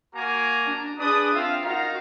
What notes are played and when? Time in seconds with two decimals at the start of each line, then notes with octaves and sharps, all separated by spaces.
0.15 A#3 F#4 G#5 A#5
0.66 D4
1.00 D4 G#4 B4 D5 D#6
1.34 C4 F4 E5 F5
1.64 D#4 F#4 A#4 F5 A#5